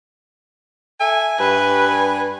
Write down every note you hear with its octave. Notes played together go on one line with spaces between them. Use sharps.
A4 E5 G#5
G2 B4